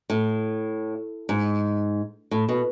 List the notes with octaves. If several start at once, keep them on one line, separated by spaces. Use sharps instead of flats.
A2
G#2
A2
B2